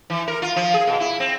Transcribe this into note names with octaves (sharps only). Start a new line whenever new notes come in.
E3
A#4
F4
F3
G#4
B2
E4
C4